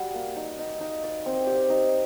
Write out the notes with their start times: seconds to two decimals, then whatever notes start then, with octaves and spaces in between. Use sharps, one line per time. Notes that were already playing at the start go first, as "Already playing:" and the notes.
Already playing: G3 F#4
0.14 A#3
0.36 D#4
0.59 D#4
0.80 D#4
1.04 D5
1.26 C4
1.47 G4
1.70 D#4